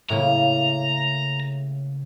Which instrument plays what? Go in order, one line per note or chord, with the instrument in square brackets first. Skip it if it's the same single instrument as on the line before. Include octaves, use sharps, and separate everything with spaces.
[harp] A2 C#3 A#3 [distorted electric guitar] A#5